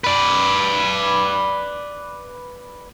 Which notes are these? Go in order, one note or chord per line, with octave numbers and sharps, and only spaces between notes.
B4 D5